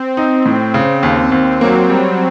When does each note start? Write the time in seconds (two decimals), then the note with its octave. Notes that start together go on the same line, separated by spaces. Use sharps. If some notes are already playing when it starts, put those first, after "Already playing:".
Already playing: C4
0.17 D#4
0.46 A2
0.74 C#3
1.03 D#2
1.32 D#2
1.61 F#3 A#3
1.90 G3